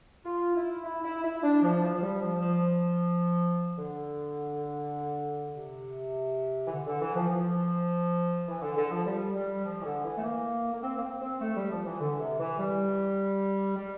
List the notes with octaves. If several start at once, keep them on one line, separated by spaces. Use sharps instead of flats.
F4
E4
E4
E4
E4
D4
F3
F3
F3
G3
F3
F3
D3
C3
E3
D3
D3
E3
F3
F3
E3
D3
D3
F3
G3
G3
F3
E3
D3
E3
A3
A#3
A#3
C4
A#3
C4
C4
A3
G3
F3
E3
D3
C3
E3
G3
G3